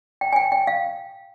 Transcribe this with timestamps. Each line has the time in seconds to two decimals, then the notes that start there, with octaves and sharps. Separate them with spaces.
0.21 G5
0.33 G#5
0.36 G5
0.52 G5
0.67 F5